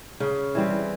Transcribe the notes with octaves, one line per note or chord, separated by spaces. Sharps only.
C#3
E3 G3 C4